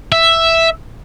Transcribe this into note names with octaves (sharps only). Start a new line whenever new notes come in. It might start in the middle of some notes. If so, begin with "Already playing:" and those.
E5